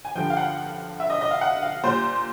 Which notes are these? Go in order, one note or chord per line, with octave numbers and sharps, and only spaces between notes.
G#5
G2 D3 F3 G5
F5
F#5
E5
D#5
D#5
F5
F#5
F5
A#2 G3 C5